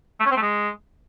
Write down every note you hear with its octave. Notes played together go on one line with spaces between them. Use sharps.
A3
C#4
C4
A3
G#3